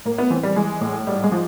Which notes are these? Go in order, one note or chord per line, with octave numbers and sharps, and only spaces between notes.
A2 A#3
B3
E3 C4
G3
E3 G#3
A2
G#2 G3
G#3
F3